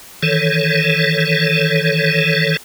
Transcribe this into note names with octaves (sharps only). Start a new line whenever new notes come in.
D#3 E3 A4 C#5